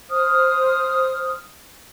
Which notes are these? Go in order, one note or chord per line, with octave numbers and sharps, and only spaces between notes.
C5 D#6 F6